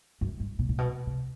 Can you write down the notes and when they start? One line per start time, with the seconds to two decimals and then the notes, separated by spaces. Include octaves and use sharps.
0.21 F#2
0.40 G2
0.59 B2
0.69 A#2
0.78 B2
1.07 C3